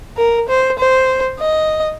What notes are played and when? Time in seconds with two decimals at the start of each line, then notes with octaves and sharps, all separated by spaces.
0.17 A#4
0.49 C5
0.79 C5
1.40 D#5